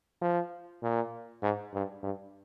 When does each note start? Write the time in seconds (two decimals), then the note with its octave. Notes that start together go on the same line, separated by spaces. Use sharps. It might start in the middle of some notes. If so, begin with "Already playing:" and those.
0.21 F3
0.83 A#2
1.42 G#2
1.74 G2
2.03 G2